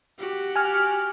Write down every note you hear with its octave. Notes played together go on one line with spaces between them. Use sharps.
F#4 G4
G#5 F6